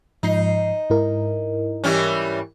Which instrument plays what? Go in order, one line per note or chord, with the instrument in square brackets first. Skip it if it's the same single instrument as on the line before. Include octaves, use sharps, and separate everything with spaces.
[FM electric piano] G#2 F3 C7 [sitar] D#4
[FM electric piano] G#2 E4 A#4
[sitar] E3 G3 C#4